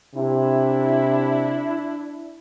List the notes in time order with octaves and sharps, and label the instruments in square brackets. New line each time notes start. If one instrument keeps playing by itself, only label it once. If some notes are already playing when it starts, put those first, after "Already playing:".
[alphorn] C3 [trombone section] D4 E4